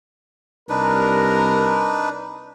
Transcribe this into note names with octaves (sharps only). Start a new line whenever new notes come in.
C2 D4 D#4 A#4 B4